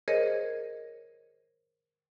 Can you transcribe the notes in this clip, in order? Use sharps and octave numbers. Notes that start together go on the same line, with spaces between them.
G#4 A#4 C5 C#5 D#5